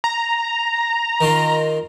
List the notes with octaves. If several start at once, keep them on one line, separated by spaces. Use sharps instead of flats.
A#5
D#3 F4